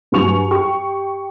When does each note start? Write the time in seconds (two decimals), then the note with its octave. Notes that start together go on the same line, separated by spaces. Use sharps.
0.12 G2 F#3 G#5 C#6 F7
0.51 G4 C#6